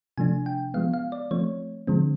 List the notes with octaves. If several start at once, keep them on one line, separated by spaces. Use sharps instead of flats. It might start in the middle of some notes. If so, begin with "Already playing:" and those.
C3 F3 A3 D4 G#5
G5
F3 G#3 B3 F5
F5
D5
F3 A3 C4 C#5
D3 F3 G#3 C4